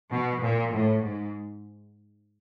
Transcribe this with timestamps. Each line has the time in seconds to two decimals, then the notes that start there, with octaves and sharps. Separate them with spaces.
0.11 B2
0.42 A#2
0.73 A2
1.02 G#2